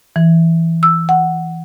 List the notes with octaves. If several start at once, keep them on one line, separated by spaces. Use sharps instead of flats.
E3
E6
F#5